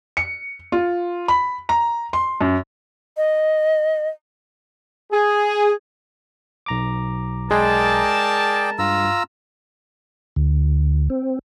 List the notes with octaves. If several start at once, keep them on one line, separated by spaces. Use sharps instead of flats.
C#7
F4
B5
A#5
C6
F#2
D#5
G#4
B1 A#5 D6
G#3 G#4 A#4 D5 G5 A5
G2 F4 A#5 E6
D2
C4